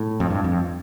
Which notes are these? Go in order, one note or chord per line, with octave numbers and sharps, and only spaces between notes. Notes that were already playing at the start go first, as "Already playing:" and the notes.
Already playing: A2
F2
G2
F2